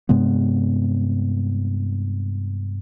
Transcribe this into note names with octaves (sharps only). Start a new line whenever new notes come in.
G2 C3 G#3 B3